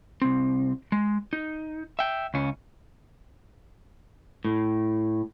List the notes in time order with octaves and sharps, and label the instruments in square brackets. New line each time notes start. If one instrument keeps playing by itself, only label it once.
[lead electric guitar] C2 C4
G#3
D#4
E5 G5
C#2 C#4
[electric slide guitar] A2